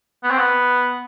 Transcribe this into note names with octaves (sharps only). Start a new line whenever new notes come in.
B3
C4
B3